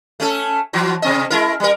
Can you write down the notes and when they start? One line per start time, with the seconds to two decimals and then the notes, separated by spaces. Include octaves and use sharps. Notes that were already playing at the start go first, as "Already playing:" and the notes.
0.20 A3 C#4 A4
0.73 E3 F#3 F#4
1.02 C3 C4 D#5
1.30 G#3 E4 A#4
1.60 G3 A#4